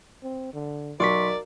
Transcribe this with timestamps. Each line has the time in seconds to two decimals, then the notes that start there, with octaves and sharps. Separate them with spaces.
0.23 C4
0.53 D3
1.00 B1 A#4 D5 C6 C#6 B6